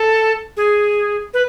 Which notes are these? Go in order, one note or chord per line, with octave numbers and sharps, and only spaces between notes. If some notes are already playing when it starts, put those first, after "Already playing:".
Already playing: A4
G#4
B4